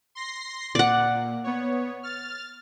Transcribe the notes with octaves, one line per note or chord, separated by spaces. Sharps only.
C6 A#6 C7
A#2 D5 F#5
B3 C#5
F6 A6